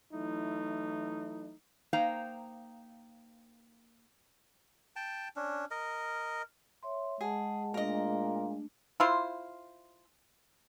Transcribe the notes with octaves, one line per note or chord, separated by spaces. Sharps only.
E3 F#3 A3 D#4 E4
A#3 D#4 C5 F5 G5 A#5
G5 A5
C#4 D4
A#4 D#5
C#5 E5 C6
G#3 G#4 F#5 A5
A#2 A3 D4 A#4 D#5
E4 F4 C5